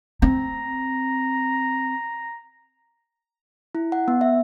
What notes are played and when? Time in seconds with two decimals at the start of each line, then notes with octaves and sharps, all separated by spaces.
0.22 C4 A#5
3.75 E4
3.92 F#5
4.08 B3
4.21 E5